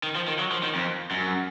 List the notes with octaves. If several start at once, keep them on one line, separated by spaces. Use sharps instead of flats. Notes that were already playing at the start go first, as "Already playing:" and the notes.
D#3
F3
D#3
F#3
F3
D#3
F2
F#2